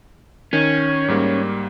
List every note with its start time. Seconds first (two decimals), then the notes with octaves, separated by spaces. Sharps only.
0.53 D#3 C#4
1.08 G#2 G3 A#3